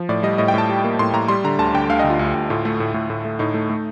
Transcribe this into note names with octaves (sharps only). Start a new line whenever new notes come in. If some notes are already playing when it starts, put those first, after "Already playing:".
Already playing: F3
A2 D5
G3 D#5
A2 D#5
G5
A2 A5
G3
A#3
A2 C6
A2 A#5
G3 C6
D3 A#5
D2 A5
D3 G5
D2 F5
D#5
D2
F4
D2
D2
A2 F4
A3
A2
A2
A2
A3
A2 D#4
A3
A3